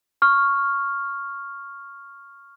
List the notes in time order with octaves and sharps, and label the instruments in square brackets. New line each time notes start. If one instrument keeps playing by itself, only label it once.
[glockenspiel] C#6 F6